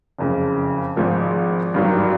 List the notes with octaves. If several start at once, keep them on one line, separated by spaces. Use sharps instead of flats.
F#1 F2 C#3
G#1 G#2 F3 G#3
G#1 G2 D#3 F#3